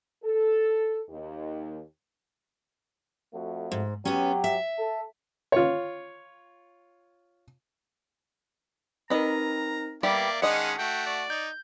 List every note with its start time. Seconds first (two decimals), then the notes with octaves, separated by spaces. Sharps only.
0.24 A4
1.10 D#2
3.34 F2 A3 F#4
3.72 G#2
4.05 F#3 B3 C#4 G4
4.44 E5
4.78 A4
5.52 F4 C#5
9.10 C4 D#4 A#4 B4 D#5 A#5
10.03 G3 A#3 B3 G4 D5 E5 D6
10.42 D#3 G#3 C#4 D4 D#5 F#5 C#7
10.79 A3 F#4 G5
11.06 D5
11.30 D#4 G6